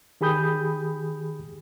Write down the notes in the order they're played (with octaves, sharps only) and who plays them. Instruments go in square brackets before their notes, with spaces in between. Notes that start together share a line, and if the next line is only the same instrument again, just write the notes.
[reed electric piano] D#3 G4 G#4 B5 D#6 G6